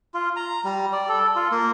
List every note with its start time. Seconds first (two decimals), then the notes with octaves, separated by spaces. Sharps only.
0.14 F4
0.36 A#5
0.64 G3
0.93 D5
1.09 A4
1.36 F4
1.52 A#3